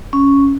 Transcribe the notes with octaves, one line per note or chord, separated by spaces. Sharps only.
C#4